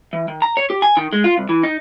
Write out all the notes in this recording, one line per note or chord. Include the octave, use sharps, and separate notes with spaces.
E3
D#3
A#5
C#5
G4
G#5
D#3
G#3
F4
C2
E3
D#4